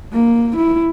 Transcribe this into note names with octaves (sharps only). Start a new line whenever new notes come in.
A#3
E4